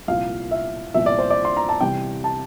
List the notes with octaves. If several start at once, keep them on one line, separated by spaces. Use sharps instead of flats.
C2 A#2 F3 F5
E5
C2 A#2 F3 E5
D5
C5
D5
C6
A#5
A5
C3 E3 G3 G5
A5